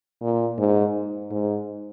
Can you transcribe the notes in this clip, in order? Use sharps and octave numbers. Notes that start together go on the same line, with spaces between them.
A#2
G#2
G#2